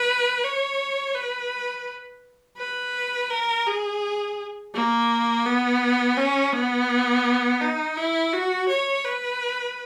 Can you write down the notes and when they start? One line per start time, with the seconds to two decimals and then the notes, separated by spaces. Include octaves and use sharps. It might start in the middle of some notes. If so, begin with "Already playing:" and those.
Already playing: B4
0.44 C#5
1.14 B4
2.58 B4
3.30 A#4
3.67 G#4
4.74 A#3
5.46 B3
6.17 C#4
6.53 B3
7.61 D#4
7.97 E4
8.32 F#4
8.69 C#5
9.05 B4